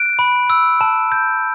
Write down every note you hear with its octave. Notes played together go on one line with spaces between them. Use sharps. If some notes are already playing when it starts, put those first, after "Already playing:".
Already playing: F#6 D7
B5
E6
A5
G6